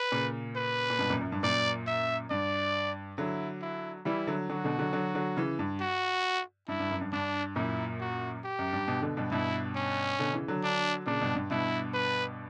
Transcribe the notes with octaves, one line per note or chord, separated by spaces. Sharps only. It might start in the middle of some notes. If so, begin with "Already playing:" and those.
Already playing: B4
A#2 C#3
B4
A#2
G2 B2
F#2 A#2
F#2
G2
F#2 A#2 D5
E5
G2 D5
D3 F#3 E4
E4
E3 G3 E4
D3 F#3
D3 F#3 F#4
B2 D3
D3 F#3
D3 F#3
D3 F#3
C#3 E3
G2
F#4
G2 E4
G2
F#2
G2
G2 D4
F#2 A#2 E4
F#4
G4
F#2
G2
G2 B2
B2 D3
G2 B2
G2 B2 E4
C#4
B2 D3
C#3 E3
D3 F#3
D4
A#2 C#3 D4
G2 B2
G2
G2 B2 E4
B4